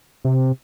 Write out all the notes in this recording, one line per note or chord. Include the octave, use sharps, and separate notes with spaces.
C3